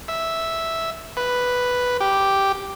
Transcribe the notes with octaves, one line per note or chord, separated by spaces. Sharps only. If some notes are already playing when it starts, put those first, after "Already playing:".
E5
B4
G4